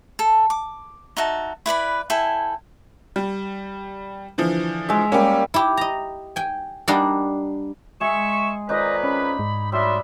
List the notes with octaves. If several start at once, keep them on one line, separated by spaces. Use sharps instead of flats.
A4
D6
D#4 F#4 E5 A5
E4 B4 D5 B5
E4 A4 G5 G#5
G3
D3 E3 F3
G#3 E5
G3 A#3 C#4
E4 G4
D#5 A#5
G5 G#5
G3 A#3 D4 D#5 F#5
G#3 G#4 E5 C#6 E7
F2 D#3 D#4 B4 D5 D#5
C#4 B5
G#2
F#3 G3 D4 E5 C6